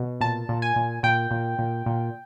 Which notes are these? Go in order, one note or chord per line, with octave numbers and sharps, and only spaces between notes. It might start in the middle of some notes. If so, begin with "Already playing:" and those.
Already playing: B2
A#2 A5
A#2
G#5
A#2
A#2 G5
A#2
A#2
A#2